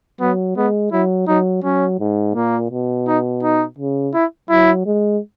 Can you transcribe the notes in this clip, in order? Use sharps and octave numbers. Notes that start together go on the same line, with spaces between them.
F#3 B3
G#3 B3
F#3 E4
F#3 D#4
F#3 C#4
G#2
A#2 A#3
B2
D#4
D#4
C#3
E4
F#3 E4
G#3